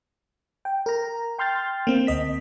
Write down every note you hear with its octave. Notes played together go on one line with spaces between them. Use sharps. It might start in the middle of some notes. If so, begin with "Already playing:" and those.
G5
A#4 A#5
G5 C6 F6 G6 A6
A#3 C4
D2 D#5 B6